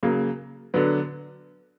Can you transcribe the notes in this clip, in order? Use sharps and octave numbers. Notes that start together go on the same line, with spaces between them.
C#3 F#3 A#3
D3 F#3 B3